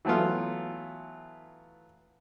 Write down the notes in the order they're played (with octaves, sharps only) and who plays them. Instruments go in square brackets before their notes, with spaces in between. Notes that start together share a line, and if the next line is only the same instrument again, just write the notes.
[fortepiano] E3 F#3 A3 B3 F4